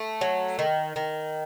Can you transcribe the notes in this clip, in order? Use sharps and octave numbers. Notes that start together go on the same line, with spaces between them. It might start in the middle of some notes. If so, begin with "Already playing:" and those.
Already playing: A3
F#3
D#3
D#3